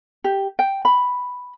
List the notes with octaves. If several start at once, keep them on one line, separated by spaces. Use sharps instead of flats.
G4
G5
B5